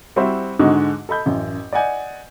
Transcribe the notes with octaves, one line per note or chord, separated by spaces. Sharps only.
G3 C4 E4 F#4 C5 E5
G#2 D3 G#3 D#4 F#4
A4 D#5 B5 G6
A1 F#2
D5 D#5 F#5 G#5 G6